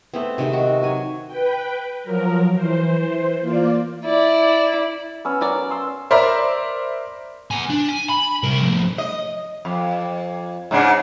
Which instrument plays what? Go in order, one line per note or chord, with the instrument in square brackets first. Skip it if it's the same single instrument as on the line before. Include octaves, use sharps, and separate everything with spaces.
[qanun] A3 B3 C4
C3 D#3 G#3
F#4
F#3 G#5
[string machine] B4 G5
F3 F#3 A#4
E3 C5
A#3 F4 D5
[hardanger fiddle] E4 D5
[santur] B3 C#4 E6
[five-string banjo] F#3 A#4 D5
[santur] C6 E6
[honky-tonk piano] A#4 C5 D5 E5 B5
[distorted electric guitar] B3 G#5
D4
G#5
B5
C2 A#4
A2 F3
[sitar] D#5
F2
G#2 C#3 D4